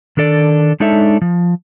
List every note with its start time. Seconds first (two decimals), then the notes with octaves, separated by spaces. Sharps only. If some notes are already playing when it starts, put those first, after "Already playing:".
0.17 D#3 D4 A4 D5
0.80 G#3 D4 D#4 A4 C#5 E5
1.22 F3